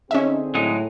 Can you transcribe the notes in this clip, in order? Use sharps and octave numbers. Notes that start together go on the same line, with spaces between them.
D3 C4 C#4 D#4 G#4 E5
A2 F#3 G#3 D#4